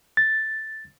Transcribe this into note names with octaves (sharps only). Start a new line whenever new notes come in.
A6